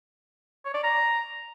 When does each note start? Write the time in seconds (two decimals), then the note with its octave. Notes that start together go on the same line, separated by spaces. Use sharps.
0.65 C#5
0.74 D5
0.83 A#5